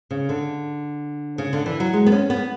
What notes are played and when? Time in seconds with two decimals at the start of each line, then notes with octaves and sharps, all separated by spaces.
0.11 C#3
0.29 D3
1.38 C#3
1.53 D3
1.66 E3
1.80 F#3
1.93 G#3
2.06 B3
2.12 C#4
2.30 B3